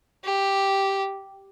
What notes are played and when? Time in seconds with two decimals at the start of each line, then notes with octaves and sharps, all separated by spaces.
0.24 G4